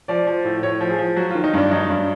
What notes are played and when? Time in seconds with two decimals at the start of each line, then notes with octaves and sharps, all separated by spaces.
0.08 F3 D5
0.27 F3
0.45 A2
0.63 A2 C#5
0.81 F3
0.90 G#4
0.99 F3
1.16 F#3 F#4
1.31 F4
1.35 D#3
1.44 D#4
1.53 G2 D4
1.71 F#3 D#4
1.89 G2